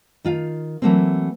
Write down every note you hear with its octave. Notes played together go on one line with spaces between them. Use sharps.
D#3 F4 F5
E3 F#3 A3 A#3 C4